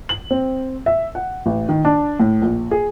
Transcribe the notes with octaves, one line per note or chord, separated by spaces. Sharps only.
F#7
C4
E5
F#5
A1
D#3
D4
A2
A#1
G#4